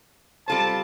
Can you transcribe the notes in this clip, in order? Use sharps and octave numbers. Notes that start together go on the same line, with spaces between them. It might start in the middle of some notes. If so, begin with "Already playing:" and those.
G3 C4 F4 A4 C5 A5